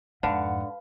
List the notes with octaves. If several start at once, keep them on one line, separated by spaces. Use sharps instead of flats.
F2 G#2 D3 B4 F5 F#5